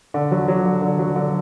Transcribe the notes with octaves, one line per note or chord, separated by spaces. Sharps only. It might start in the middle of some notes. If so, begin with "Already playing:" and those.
D3
F#3
F#3
D3
D3
F#3
D3